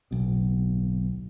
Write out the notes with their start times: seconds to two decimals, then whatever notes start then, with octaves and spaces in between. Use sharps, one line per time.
0.11 D1 B1 B2